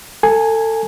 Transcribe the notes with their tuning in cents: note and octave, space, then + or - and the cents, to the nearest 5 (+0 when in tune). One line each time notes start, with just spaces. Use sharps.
A4 +30 G#5 +0